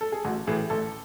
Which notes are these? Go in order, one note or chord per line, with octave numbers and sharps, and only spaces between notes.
A4
G#4
A1 F#4
A2 E3 G#4
A1 A4